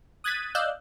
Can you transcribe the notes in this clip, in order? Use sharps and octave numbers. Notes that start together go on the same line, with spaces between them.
D#6 F#6 G#6 A6 B6 D#7
D5 D#5 F5 E6 F#6 G6